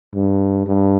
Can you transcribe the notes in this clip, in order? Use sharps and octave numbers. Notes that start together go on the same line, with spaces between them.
G2
G2